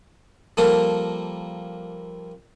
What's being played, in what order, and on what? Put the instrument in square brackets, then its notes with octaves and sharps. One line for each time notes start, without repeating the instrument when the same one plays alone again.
[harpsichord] F3 G3 A#3 A4 A#4